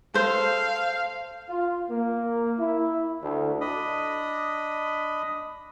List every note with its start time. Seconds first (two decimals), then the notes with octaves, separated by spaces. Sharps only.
0.14 A4 C5 F5
1.48 F4
1.90 A#3
2.59 E4
3.23 D2
3.61 D4 D#5 B5 D#6